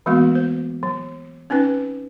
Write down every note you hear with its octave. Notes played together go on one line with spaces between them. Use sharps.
E3 G#3 A#3 B3 F#4
C5
F#3
C4 C#4 D#4 B4